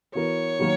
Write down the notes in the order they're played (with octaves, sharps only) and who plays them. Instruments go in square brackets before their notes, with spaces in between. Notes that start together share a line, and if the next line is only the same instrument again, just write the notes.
[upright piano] E3 B3 F#4 A#4 [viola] C#5
[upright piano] D#3 F#3 A#3